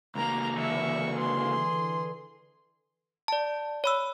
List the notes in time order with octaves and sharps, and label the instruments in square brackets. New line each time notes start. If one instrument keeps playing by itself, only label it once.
[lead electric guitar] C#2 A#3 [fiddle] A#5
[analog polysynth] D3 E3 [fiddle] E5 C#6
[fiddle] G#4 C6
[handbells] D5 A5
C#5 B5 E6